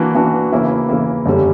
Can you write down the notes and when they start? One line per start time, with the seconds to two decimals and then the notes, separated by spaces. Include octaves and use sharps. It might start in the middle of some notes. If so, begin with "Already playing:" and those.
Already playing: E3 A#3 D4 F#4
0.15 E3 A#3 D4 F#4
0.52 C#3 E3 A#3 E4
0.89 C#3 E3 A#3 E4
1.26 F#2 D3 G3 C#4